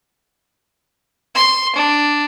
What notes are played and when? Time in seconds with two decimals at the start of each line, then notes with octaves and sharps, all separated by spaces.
1.35 C6
1.76 D4